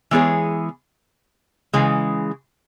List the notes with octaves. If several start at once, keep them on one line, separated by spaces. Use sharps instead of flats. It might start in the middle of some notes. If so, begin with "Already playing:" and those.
E3 G#3 B3 G#4 C#5
C#3 E3 G#3